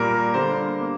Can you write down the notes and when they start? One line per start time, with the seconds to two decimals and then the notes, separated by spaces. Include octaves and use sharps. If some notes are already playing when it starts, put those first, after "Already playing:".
Already playing: A#2 G3 A#3 A#4
0.34 D3 G3 A#3 C5
0.81 A#3